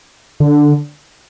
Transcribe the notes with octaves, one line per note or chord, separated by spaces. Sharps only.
D3